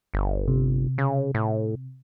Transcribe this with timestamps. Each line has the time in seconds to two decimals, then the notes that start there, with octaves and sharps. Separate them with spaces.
0.14 G1
0.48 C3
0.98 C#3
1.35 A2